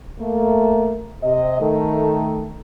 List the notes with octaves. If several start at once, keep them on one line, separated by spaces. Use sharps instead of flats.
A3 A#3
C3 D#5
D#3 A3